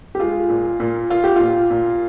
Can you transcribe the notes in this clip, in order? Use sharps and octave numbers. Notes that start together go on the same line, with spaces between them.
G4
G#3 F4
A#2
A#2
A#2 F4
G4
A#2 F4
A#2